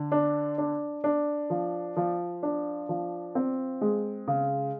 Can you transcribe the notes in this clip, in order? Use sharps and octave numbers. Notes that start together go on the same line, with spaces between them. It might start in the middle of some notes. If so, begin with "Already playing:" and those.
Already playing: D3
D4
D4
D4
F3
F3
D4
F3
C4
G#3
C#3